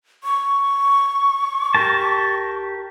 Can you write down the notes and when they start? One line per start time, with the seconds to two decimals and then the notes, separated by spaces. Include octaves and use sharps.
0.24 C#6
1.75 G4 A#4 A5